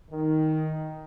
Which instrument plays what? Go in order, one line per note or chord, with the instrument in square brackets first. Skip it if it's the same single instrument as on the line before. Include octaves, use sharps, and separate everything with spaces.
[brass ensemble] D#3